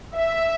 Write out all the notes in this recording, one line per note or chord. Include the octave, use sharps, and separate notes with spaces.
E5